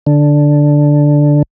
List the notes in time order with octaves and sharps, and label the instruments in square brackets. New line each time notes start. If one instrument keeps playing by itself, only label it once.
[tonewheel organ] D3